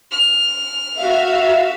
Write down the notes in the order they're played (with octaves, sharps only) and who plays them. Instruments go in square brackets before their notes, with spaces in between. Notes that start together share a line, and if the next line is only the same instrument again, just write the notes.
[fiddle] F6
[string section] F#4 E5 F5